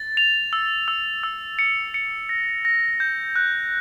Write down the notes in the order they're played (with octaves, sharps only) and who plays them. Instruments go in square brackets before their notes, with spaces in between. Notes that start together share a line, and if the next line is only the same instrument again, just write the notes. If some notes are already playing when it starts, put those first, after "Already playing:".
Already playing: [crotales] A6
F7
E6
E6
E6
C#7
C#7
A#6
A#6
G6
F#6